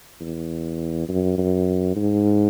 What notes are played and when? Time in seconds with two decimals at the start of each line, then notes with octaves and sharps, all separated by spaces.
0.20 E2
1.08 F#2
1.38 F#2
1.96 G#2